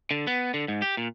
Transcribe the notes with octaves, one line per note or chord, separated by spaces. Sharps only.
D3
B3
D3
G#2
G4
A#2